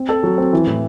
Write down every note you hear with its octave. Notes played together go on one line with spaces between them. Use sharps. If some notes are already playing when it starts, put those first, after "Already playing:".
Already playing: C4
A4
F#3
C4
E3
A2